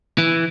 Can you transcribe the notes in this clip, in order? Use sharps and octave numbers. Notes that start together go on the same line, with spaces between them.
E3